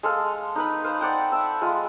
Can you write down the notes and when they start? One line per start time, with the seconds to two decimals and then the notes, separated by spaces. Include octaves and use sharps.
0.03 G#3 A4 F5
0.56 D#4 B4 B5
0.84 B4 C5 F5
1.01 D5 F#5 G5
1.32 E5 A5
1.61 G#3 F4